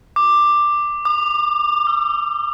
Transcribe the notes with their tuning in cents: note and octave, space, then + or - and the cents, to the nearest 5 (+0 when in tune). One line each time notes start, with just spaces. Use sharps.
D6 +10
D6 +45
E6 +35